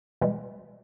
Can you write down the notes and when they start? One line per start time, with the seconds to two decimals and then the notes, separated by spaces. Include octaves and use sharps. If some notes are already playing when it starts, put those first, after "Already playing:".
0.21 B2 E3 G3 G#3